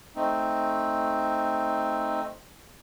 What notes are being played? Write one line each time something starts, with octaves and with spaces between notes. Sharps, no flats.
A3 C4 D#4